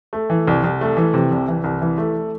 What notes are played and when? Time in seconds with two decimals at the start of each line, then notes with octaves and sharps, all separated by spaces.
0.13 A3
0.30 E3
0.48 C2
0.64 C2
0.81 A3
0.97 E3
1.14 C3
1.31 C2
1.48 E3
1.64 C2
1.82 E3
1.98 A3